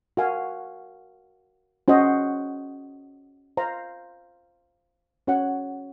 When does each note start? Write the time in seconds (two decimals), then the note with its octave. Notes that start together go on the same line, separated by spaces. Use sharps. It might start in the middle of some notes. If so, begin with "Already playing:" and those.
0.17 F#4 A#4 F5 G#5
1.88 C#4 F#4 C5 D#5
3.57 C5 F5 A#5
5.27 C#4 F#4 C#5 F#5